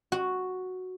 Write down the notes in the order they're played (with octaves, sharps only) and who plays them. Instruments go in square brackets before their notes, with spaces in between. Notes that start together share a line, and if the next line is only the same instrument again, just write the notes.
[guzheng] F#4